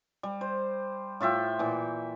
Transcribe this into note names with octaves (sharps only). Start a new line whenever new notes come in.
G3
C5
A2 F4 E5 G5
A#2 E3